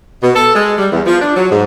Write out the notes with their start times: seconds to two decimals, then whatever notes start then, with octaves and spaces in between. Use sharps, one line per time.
0.23 B2
0.36 A4
0.55 G#3
0.78 G3
0.92 E2
1.06 F3
1.20 D4
1.36 F#3
1.51 G#2